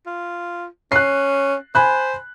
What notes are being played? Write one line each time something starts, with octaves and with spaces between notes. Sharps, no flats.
F4
C#4 F#6 C7
C5 G#5 B5 F#6